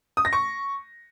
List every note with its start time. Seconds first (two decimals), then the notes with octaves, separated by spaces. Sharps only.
0.17 D#6
0.25 A#6
0.33 C#6